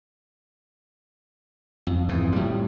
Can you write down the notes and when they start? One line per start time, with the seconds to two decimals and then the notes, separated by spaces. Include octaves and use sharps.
1.87 F2
2.09 F2 G#2 E3
2.33 A2 G3